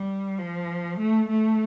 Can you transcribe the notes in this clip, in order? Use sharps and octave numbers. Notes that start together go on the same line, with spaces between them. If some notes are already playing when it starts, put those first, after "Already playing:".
Already playing: G3
F3
A3
A3